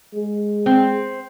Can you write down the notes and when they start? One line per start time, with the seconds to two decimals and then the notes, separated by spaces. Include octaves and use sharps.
0.15 G#3
0.66 C4